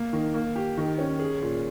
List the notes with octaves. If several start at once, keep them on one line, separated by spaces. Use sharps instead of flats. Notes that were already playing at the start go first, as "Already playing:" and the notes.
Already playing: A#3
D#3
A#3
G4
D#3
C#4
G#4
A#2